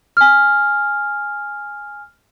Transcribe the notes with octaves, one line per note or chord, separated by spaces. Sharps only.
G#5 F6